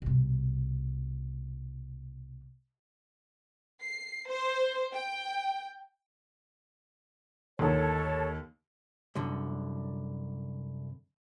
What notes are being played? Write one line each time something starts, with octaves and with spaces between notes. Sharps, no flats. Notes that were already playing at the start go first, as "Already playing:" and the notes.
C2 B2
C7
C5
G5
D#2 D3 D#3 A4 C#5
C2 F#2 D3